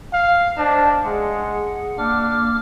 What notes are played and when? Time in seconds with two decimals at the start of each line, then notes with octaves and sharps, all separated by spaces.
0.13 F5
0.57 D4 C5 D#5 A5
1.04 G#3 G#4 F#5
1.98 A#3 D4 D6 F6